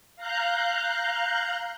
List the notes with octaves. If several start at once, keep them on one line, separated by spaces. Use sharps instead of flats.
F5 A#5 F#6 G6